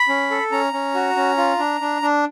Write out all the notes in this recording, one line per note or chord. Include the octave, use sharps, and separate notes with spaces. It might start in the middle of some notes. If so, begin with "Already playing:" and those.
Already playing: B5
C#4
A4
C#4 A#5
C#4
F#4
C#4
F4
D4
D4
D4